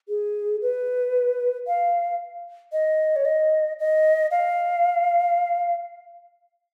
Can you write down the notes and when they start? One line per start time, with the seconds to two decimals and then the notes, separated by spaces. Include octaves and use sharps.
0.09 G#4
0.62 B4
1.67 F5
2.72 D#5
3.16 C#5
3.25 D#5
3.79 D#5
4.31 F5